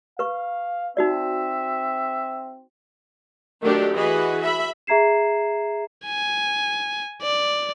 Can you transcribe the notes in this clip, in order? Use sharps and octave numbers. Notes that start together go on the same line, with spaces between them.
B4 F5 C#6
C4 D#4 F#4 D5 E5
D#3 F#3 A3 D4 G4
E3 F#4 G#4 B4 D#5
E5 B5
G#4 E5 A#5 G#6 C7 E7
G#5
D5